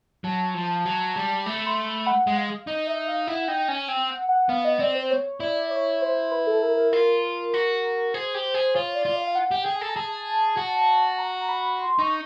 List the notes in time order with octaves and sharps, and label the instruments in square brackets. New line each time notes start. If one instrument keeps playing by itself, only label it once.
[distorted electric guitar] F#3 [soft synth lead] A5
[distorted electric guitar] F3
F#3
G3
[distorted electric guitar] A3 [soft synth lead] B5
[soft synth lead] C6
B5
F#5
[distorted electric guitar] G#3
[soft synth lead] F5
[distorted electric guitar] D#4 [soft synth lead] D#5
[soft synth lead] E5
F5
[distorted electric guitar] E4 [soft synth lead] F#5
[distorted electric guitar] D#4 [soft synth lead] G5
[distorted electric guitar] C#4 [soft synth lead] G#5
[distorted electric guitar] C4 [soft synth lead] G5
[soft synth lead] F#5
F#5
[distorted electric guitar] B3 [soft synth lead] F5
[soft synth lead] D#5
[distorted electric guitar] C4 [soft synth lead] D5
[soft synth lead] C5
C#5
[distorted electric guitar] E4 [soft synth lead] D5
[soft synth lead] C#5
C5
B4
A4
A#4
A#4
[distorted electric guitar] F4 [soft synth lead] A#4
[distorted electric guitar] F#4
[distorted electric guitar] G#4 [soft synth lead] C5
[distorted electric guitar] G4
G#4
[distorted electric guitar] F4 [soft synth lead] C#5
[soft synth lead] D5
[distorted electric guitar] F4
[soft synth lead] F5
F5
F#5
[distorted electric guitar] G4 [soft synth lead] G5
[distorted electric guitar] G#4
[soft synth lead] G#5
[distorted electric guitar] A4
[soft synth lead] A#5
[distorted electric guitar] G#4 [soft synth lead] A5
[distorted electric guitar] F#4
[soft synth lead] A#5
B5
C6
[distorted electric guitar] D#4 [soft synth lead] C#6